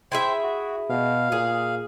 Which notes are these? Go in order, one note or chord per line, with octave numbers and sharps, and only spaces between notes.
E4 G#4 C5 E5 G5
F#4
B2 F5
A#2 G#4